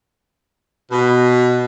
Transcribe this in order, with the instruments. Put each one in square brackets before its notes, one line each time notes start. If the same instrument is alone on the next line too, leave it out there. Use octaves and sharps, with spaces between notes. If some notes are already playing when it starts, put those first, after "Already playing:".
[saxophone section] B2